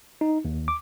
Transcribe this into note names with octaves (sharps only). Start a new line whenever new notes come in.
D#4
D#2
D6